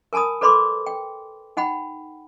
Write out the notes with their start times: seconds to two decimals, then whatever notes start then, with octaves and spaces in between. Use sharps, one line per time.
0.13 A#4 G#5 A5 B5 D#6
0.41 A4 B4 D5 B5 C6 D6
0.86 G5
1.57 D#4 F#5 G5 B5